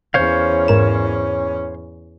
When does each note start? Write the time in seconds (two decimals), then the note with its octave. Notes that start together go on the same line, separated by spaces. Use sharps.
0.14 E2 C#4 C5 C#5 F5
0.68 G#2 A#4 E7